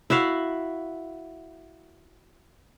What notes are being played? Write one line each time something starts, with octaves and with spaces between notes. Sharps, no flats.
E4 F#4 E5 F5